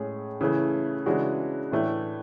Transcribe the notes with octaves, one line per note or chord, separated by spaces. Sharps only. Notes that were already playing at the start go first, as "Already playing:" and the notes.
Already playing: A2 G#3 C#4 G#4
C#3 E3 A3 E4 G#4
C#3 E3 G#3 D4 F#4
A2 E3 A3 D4